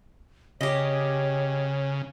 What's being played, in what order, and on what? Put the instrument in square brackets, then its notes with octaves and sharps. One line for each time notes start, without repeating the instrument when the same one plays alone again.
[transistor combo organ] C#3 [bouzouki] G4 D#5 [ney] C#5